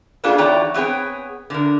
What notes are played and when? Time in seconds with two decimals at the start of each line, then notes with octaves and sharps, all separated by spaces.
0.24 A#3 B3 D4 F4 G#4 A4
0.38 E2 D#4 F#4 C#5 D5 G5
0.74 B3 C4 G#4 C#5 G5
1.50 D3 A#4